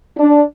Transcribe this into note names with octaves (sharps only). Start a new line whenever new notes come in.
D4